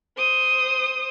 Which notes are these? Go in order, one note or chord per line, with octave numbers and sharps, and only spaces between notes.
C5 D#6